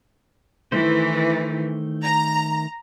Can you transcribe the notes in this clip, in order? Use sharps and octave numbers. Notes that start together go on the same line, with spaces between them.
D#3 E3 A3 C5
A#5